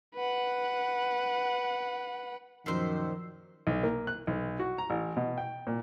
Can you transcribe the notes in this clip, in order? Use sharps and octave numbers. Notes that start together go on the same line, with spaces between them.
B4 F#5
F#2 A#2 D#3 F3 C5 E6 C7
B1
A#3
F#6
B1
F#4
A#5
A1
B2
G5
A#2